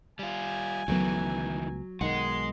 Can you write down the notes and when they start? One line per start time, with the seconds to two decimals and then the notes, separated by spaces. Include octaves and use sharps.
0.19 G3 F4 G#5
0.88 C#2 D#3 E3 F#3 A3 B3
2.01 B1 D#3 G#3 F#5 C6